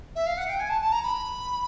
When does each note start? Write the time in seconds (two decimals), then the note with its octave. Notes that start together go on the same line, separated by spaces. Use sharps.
0.16 E5
0.26 F5
0.37 F#5
0.49 G5
0.60 G#5
0.70 A5
0.81 A5
0.92 A#5
1.03 B5